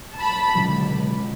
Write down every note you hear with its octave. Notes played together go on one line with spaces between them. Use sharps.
A5 B5
C#2 B2 D3 F#3